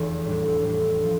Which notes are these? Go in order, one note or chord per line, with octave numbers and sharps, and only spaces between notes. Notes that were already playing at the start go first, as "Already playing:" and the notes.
Already playing: F1 E2 E3
A2 G3 D4
A2 G3 D4
F3